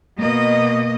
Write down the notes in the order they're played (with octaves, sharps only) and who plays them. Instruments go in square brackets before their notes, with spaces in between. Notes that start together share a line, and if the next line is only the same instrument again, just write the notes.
[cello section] B2 A#3 D#5